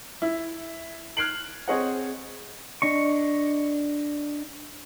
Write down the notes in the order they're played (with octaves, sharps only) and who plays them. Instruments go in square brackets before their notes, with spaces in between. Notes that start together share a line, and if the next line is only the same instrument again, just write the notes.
[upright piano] E4
F6 F#6 G#6 C7 D7 F#7
C4 G#4 C#5 D#5 F#5
[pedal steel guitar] D4 D#5 C#6